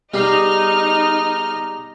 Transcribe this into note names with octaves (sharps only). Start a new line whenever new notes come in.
G3 B3 D#4 G#4 D#5 A#5 F6 C7